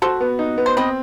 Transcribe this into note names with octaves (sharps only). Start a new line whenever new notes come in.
F#4 A4 C5
B3
D#4
B3
C5
C4 B4 D#5